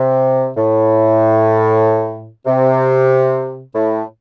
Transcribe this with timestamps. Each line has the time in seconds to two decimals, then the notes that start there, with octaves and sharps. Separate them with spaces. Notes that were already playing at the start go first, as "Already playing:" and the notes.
Already playing: C3
0.56 A2
2.46 C3
3.74 A2